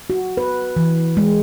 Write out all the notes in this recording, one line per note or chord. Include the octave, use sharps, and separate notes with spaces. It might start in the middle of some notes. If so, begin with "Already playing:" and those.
F#4
B4
E3
G#3